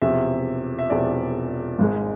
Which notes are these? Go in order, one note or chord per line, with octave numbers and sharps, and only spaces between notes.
E1 E2 C3 F3 E5
E5
E1 E2 C3 F3 D5
G#1 G#2 G#3